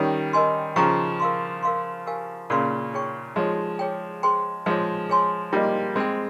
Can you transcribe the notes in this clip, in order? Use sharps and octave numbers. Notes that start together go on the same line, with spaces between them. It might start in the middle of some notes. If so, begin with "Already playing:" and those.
Already playing: D#3 G3 C#4 G4 C#5
D#4 A#4 D#5 G#5 C6
C#3 F3 G4 C5 G5 A#5 C#6
A#4 F5 C6
A#4 F5 C6
G4 A#4 F5 G#5
A#2 C#3 A#4 F5 C6
D#4 G#4 C#5 G5 C#6
F3 G#3 D#4 G4 C#5
G#4 C#5 G5
G#4 C5 G5 C6
F3 G#3 D#4 G#4 C#5
G#4 C#5 G#5 C6
G3 A#3 F4 G#4 C5 D#5
G#3 C4 G#4 C5 G5